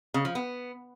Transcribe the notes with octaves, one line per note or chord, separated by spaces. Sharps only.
C#3
F3
B3